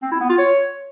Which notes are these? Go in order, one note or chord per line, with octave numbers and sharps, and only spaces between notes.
C4
E4
B3
F4
C#5